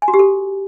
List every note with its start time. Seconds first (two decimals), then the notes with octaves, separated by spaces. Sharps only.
0.02 G#5
0.08 F#4
0.14 G4
0.19 A4